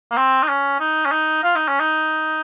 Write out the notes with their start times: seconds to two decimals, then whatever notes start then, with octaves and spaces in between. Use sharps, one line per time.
0.11 A#3
0.17 C4
0.43 D#4
0.49 C#4
0.80 D#4
1.06 C#4
1.12 D#4
1.43 F4
1.56 D#4
1.68 C#4
1.80 D#4